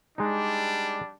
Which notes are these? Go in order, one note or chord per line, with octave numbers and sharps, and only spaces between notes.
G3 G#3 D4 D#4